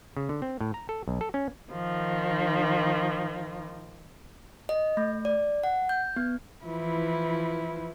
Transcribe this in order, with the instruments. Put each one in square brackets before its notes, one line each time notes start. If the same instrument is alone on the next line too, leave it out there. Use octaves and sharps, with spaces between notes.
[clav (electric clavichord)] C#3
D3
C4
A2
A#5
A4
B1
A4
C#4
[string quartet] D#3 F3
[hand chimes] D#5
A3
D5
F#5
G6
B3
[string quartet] E3 F3 E4 B4